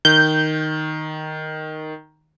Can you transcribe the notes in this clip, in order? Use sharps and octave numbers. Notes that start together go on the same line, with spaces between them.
D#3 G6